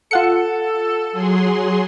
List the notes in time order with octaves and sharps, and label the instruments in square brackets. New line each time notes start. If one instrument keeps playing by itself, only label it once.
[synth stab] F4 F#5 C#7 [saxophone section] A4
[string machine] F#3 G#4 C6